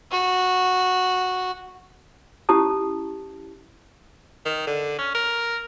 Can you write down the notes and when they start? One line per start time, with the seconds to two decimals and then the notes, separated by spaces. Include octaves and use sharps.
0.11 F#4
2.49 C#4 E4 G4 A5 D#6
4.46 D#3
4.67 D3
4.99 C#4
5.15 A#4